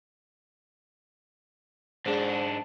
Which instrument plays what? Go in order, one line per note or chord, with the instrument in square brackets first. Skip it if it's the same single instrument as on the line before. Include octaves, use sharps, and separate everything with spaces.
[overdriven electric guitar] G#2 D4 [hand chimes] G#4 C5
[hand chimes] A5